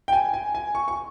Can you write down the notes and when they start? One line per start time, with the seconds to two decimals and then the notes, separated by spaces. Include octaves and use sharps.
0.08 G5
0.13 G#5
0.34 G#5
0.55 G#5
0.75 C#6
0.88 C#6